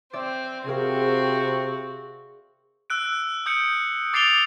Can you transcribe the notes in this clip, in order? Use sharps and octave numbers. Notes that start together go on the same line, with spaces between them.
C4 D5 E5
C3 C4 F#4 G#4 A#4 F5
E6 F#6 D7
D#6 G6 C#7 D7
D6 A6 C7 D7 F7 G7